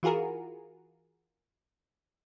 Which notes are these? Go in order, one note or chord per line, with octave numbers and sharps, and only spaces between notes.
E3 F4 F#4 G#4 A#4